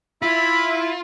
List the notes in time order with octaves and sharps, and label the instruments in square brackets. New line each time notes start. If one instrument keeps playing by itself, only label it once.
[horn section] E4 [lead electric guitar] F4 [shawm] B5